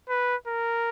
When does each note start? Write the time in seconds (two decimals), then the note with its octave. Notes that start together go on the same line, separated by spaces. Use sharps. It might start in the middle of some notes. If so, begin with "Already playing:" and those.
0.09 B4
0.47 A#4